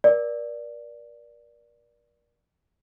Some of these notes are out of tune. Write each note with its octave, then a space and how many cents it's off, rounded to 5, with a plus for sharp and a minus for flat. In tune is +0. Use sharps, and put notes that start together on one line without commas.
A#4 +40 D5 +0